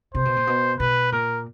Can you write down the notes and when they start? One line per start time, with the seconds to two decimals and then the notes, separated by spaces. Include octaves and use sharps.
0.14 C3 C5
0.25 B2
0.36 A#2
0.47 B2
0.79 B2 B4
1.12 A#2 A#4